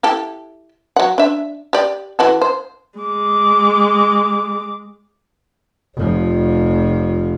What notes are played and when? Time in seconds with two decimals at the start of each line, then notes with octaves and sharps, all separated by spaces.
0.03 E4 G4 A4
0.96 F#3 F#5
1.18 D4 E5
1.73 G4 D5
2.19 E3 F#4 A4
2.42 C5
2.99 G#3 D6
5.96 F1 F3